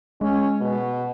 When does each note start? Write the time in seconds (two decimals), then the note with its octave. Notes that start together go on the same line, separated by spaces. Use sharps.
0.21 G#3 C#4
0.61 B2